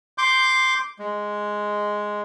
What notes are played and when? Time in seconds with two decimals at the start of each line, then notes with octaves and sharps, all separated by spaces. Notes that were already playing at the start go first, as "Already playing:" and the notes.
0.18 C6 D6 G6
0.99 G#3